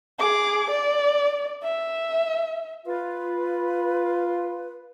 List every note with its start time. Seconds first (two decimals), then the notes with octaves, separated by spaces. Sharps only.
0.19 G#4 D6
0.71 D5
1.63 E5
2.86 F4 B4